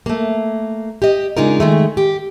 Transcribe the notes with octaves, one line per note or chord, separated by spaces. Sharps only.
A3 A#3
G4 D#5
C#3 G#3 D4 D#4 F4 A#4
D#3 G#3 A3
G4